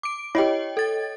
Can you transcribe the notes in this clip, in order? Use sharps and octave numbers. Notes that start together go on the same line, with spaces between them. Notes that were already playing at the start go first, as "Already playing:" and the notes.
D6 D7
E4 G4 C#5 D#5 G5
A4 A6